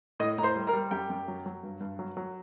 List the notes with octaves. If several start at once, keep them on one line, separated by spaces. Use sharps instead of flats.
A2 D#5 D#6
A2 A#5
C5 C6
G3
A#4 A#5
G3
F#2 G4 G5
F#2
F#3
F#3
G2
G2
F#3
F#3